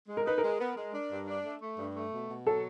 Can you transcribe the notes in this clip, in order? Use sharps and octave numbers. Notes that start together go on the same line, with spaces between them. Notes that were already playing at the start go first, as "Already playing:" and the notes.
G#3
A#4
D#4 B4
G#3 A#4
B3
G#3
D4
G2
D4
A3
A3
G2
A3
B2
B2
F#3 A4